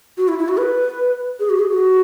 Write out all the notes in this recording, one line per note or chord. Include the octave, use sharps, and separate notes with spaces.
F#4
E4
E4
F#4
B4
G#4
F#4
G#4
F#4